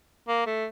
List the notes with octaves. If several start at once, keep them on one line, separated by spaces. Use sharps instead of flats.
A#3
A3